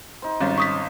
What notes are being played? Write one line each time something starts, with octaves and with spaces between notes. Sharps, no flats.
D#4 C5
G#1 G3 C#4 A6
C#6 D#6 B6